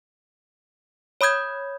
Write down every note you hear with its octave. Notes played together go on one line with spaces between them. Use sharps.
C#5 B5 D#6 G6 G#6